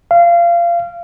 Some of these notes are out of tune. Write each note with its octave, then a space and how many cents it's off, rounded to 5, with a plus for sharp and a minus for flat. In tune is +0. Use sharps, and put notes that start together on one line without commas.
F5 -25